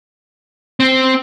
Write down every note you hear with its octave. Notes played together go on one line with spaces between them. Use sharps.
C4